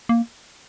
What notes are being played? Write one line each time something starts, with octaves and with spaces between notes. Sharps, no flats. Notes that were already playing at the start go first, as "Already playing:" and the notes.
A#3